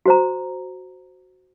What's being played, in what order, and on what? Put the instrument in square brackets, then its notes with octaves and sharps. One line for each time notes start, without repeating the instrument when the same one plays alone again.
[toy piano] F#4 C5 A#5